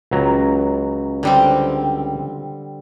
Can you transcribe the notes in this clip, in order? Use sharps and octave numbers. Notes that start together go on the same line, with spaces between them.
C#2 F#3 A#5
D3 G3 C4